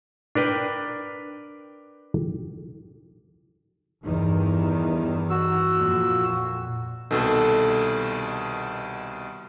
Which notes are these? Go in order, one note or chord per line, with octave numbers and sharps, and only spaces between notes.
D4 A#4 B4 G5
E2 G2 D#3
F#4 E6
F2 A#2
C2 B2 D#3 A4